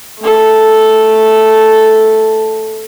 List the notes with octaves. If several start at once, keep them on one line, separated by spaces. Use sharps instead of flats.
A3 A4